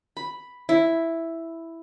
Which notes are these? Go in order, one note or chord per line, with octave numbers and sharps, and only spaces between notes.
B5
E4